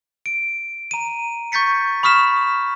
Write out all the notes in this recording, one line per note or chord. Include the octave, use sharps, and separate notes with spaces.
D7
A#5 D#7
C#6 G6 A6 B6 C#7
B5 C#6 D#6 F6 B6 E7